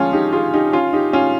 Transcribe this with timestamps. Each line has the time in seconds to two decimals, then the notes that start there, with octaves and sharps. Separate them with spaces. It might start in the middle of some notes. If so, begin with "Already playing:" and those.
Already playing: F3 G#3 C#4 F4
0.13 D#4 G4
0.32 F4 G#4
0.54 D#4 G4
0.73 C#4 F4
0.93 D#4 G4
1.13 C#4 F4